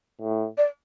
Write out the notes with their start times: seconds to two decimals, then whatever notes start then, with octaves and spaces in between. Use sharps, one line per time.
0.21 A2
0.58 D5